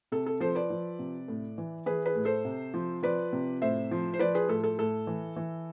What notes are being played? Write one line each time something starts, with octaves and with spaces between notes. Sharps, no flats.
C3 A4
A4
F3 A4 C5
B4 D5
F3
C3
A2
E3
E3 G#4 B4
G#4 B4
A2
A4 C5
C3
F3
F3 B4 D5
C3
A2 C5 E5
F3
C5
F3 B4 D5
G#4 B4
A2 A4
A4
A2 A4
E3
E3